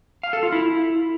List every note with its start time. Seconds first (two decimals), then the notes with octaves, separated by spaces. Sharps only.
0.23 F5
0.33 A4
0.43 F4
0.52 E4